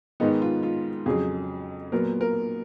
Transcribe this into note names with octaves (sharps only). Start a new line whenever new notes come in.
G#2 D#3 G#3 B3 D#4
F4
F4
F2 C#3 F#3 G#4
A#2 F#3 B3 A#4
A#4